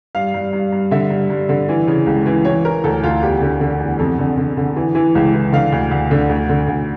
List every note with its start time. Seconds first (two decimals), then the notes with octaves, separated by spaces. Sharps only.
0.15 G2 F5
0.34 G2
0.53 G2
0.72 G2
0.91 D3 E5
1.10 G2
1.30 G2
1.49 D3
1.69 E3
1.87 C#3
2.06 C#2
2.26 E3
2.45 E3 C#5
2.64 E3 A#4
2.84 D2 A4
3.03 D2 F4
3.22 E2 G4
3.41 D3
3.61 D3
3.80 E2
3.99 F2 A4
4.18 D3
4.37 D3
4.57 D3
4.76 E3
4.95 E3
5.15 C#2
5.34 E3
5.53 D3 F5
5.72 D2
5.91 D2
6.11 D3
6.29 D2
6.49 D3
6.68 D2